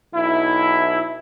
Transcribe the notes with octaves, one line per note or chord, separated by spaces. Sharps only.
B1 E4